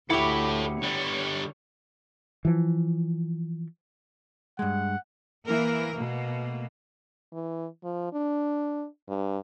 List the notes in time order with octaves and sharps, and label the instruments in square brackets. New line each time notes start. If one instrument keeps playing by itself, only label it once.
[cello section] D2 [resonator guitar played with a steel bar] E4 G4 [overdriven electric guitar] A4 C#5 [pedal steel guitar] F#5 B5 D6
[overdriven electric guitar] D3 G3 [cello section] C#5
[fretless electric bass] E3 F3
[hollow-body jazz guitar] G2 G#3 [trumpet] F#5
[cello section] E3 A#3 E4 A#4
B2 A3 A#3
[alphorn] E3
F3
D4
G2